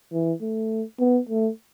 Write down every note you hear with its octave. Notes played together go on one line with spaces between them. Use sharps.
E3
A3
B3
A3